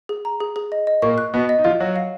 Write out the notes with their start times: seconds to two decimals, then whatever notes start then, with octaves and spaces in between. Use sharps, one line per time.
0.09 G#4
0.25 A#5
0.40 G#4
0.56 G#4
0.72 D#5
0.87 D#5
1.02 A#2 A#3 C#6
1.18 F#6
1.34 B2 B3 D#5
1.49 D#5
1.59 D#4
1.64 F3 F4 F5
1.80 F#3 F#4 C#5
1.96 F5